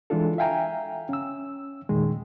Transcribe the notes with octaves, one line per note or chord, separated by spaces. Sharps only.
E3 G#3 D4 F4 A4
E5 F5 G5 G#5 A#5
C#4 E6
E2 A#2 D#3 G#3